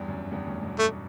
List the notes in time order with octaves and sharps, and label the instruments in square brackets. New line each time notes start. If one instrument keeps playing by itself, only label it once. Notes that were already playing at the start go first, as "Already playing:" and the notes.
Already playing: [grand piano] E2 G2
F#2
E2 G2
F#2 A2
G2 B2
[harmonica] A3